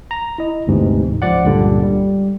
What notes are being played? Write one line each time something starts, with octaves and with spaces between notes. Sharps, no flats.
A#5
E4 D#5
G1 D2 G#2 C3 E3
C#2 F3 D5 F#5
C#2 G2 A#2 D3 G3
G3